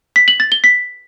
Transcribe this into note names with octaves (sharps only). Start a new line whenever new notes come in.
B6
F#7
A6
G7
B6